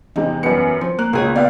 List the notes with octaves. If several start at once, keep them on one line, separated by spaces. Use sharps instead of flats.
E2 C3 G#3 D#4
F#2 G3 B3 C#7
F3 C4
A#3 F#6
C#2 A#2 A#3 G#4 C#5
B3 D5 F5